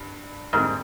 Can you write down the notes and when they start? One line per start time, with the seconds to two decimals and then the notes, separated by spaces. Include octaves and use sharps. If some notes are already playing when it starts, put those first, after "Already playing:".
Already playing: G2
0.53 F2 G#2 D3 G3 A#3 D4